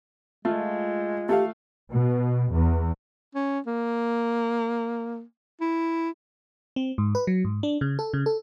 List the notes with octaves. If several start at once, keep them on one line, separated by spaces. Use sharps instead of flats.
G#3 A3 F4
A3 G4 A4 F5
B2
E2
C#4
A#3
E4
C4
G#2
B4
F#3
G#2
D4
C#3
A4
C#3
A4